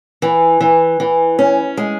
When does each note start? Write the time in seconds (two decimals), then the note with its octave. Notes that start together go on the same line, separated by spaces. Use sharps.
0.22 E3
0.61 E3
1.00 E3
1.39 C#4
1.77 G#3